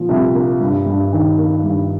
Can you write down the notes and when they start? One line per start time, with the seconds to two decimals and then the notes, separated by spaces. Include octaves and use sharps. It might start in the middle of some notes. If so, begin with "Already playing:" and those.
Already playing: A#2 F3
0.09 C2
0.35 A#3
0.60 G2
0.86 G2
1.13 D#3
1.38 A#3
1.64 G2